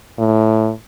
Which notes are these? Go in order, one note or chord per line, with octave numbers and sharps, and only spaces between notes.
A2